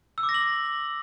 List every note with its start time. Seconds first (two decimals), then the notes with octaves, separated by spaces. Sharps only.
0.18 E6
0.23 D6
0.29 A#6
0.34 F#7